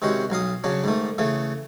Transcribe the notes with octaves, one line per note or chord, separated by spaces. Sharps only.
C3 D#3 G#3 C#4 F#4 F#5
B1 F#3 F5 D#6
C#3 F#3 C#4 D4
G#2 D#3 A3
C#3 E3 A3